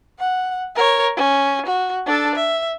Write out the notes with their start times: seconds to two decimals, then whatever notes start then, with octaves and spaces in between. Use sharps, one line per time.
0.19 F#5
0.76 A#4 C#5
1.16 C#4
1.66 F#4
2.06 D4 A4
2.35 E5